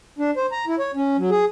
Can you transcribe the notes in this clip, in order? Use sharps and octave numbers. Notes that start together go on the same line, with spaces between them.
D4
C5
A#5
E4
C#5
C#4
F#3
G#4